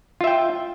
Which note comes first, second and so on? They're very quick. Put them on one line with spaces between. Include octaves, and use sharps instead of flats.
F4 E5 G5